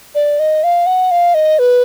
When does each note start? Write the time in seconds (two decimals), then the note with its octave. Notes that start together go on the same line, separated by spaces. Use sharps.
0.15 D5
0.39 D#5
0.64 F5
0.86 F#5
1.11 F5
1.34 D#5
1.59 B4